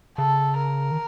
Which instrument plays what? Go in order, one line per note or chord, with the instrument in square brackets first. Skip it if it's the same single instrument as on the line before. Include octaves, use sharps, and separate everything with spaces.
[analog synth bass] C#3 [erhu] A4
[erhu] A#4
[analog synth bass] D#3